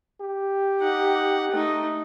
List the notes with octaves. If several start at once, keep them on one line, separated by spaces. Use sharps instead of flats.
G4
D#4 F#5
A3 D#4